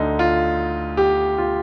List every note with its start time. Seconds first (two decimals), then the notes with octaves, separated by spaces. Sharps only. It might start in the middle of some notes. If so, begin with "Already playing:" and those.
Already playing: D2 D3 D#4
0.19 F4
0.97 G4
1.38 F4